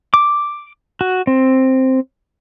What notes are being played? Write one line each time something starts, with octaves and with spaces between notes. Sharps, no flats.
D6
F#4
C4